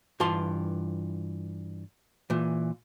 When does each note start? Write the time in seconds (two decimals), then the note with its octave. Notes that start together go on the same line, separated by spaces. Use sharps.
0.20 G2 E3 F4 A5 C6
2.30 A#2 E3